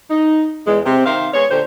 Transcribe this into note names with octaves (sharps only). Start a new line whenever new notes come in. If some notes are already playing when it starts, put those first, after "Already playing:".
D#4
E2 G#3
C3 C4
D#3 C5 E5 F5
G#3 B3 C#5
A#2 D3 G4 C5